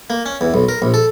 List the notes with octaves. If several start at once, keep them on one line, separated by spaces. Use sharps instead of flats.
A#3
C#4
E2
B1
A#4
A#1
A4